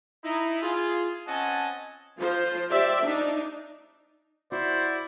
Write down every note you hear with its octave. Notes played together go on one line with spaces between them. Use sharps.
D#4 E4
F4 G#4
C4 C#4 D#5 F#5 G#5 A5
F3 F4 C5
G4 C5 D5 E5
D4 D#4
E4 F#4 C5 D5